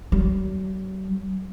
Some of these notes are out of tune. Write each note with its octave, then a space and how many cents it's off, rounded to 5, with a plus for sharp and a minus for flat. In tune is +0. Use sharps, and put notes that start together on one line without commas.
F#3 +45